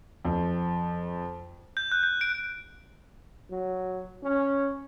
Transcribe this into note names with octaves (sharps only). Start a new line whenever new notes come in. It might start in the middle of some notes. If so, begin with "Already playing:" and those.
F2
G6
F#6
G6
D7
F#3
C#4